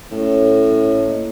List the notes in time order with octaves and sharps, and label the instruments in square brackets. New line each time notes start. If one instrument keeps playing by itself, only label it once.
[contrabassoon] A2 [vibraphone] C#4 A4 C#5
[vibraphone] A#3 D#5